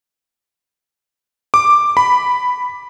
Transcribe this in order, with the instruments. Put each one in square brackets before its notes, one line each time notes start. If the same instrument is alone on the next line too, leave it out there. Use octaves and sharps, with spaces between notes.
[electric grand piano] D6
B5